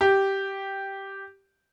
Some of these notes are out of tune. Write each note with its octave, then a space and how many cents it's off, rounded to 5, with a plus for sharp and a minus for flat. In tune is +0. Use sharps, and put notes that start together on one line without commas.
G4 -5